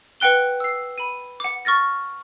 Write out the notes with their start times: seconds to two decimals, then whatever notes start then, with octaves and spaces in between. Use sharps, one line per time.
0.20 B4 F#5 G5 F#6 G7
0.60 E6 C7
0.98 B5 D#7
1.40 F#5 D6
1.65 C#6 F6 A6 A#6